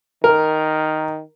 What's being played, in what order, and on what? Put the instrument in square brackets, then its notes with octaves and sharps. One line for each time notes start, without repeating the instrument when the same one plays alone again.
[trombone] D#3 [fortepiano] A#4